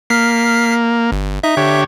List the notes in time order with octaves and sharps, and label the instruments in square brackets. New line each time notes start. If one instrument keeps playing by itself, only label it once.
[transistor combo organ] A#3 [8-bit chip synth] F6 B6 C7
[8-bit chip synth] G1
[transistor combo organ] D#4 [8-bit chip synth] E5
[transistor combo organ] D3 G4 C#5